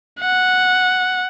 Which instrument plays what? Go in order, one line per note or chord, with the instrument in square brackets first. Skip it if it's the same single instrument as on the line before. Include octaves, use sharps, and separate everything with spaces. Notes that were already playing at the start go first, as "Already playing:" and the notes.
[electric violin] F#5